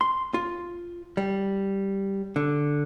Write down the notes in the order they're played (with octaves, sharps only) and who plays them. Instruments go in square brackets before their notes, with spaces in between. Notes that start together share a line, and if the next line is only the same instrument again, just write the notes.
[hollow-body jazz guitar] C6
F4
G3
D3